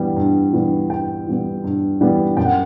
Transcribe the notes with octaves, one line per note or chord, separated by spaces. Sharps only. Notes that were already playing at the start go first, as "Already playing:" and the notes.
Already playing: G2 E3 G3 B3
G2
E3 G3 B3
G2 G5
E3 G3 B3
G2
E3 G3 B3
F#2 G5
F#5